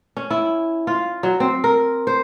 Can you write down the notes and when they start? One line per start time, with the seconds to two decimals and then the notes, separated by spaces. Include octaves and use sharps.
0.17 C#4
0.31 E4
0.87 F4
1.23 F#3
1.40 C4
1.64 A#4
2.07 C5